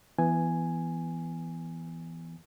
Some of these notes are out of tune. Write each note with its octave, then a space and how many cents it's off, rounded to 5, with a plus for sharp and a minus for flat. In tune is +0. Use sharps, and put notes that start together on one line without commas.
E3 +15 B3 +0 G#5 +0